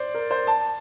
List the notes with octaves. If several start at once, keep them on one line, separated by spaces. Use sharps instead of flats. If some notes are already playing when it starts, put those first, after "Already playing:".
Already playing: C5 D5
A#4
C5
A5